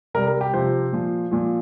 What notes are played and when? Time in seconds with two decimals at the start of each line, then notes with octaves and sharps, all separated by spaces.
0.14 C3 G3 A#4
0.27 A#4
0.41 G4
0.54 C3 F3 C5
0.93 A#2 F3
1.31 A#2 F3